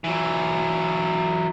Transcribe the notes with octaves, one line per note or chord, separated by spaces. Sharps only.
E3 F#3